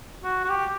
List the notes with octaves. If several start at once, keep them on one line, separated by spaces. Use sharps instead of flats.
F#4
F#4
G4